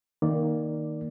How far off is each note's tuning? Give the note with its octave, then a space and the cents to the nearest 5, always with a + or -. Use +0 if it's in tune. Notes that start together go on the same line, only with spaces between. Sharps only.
D#3 +0 A#3 +0 D5 +0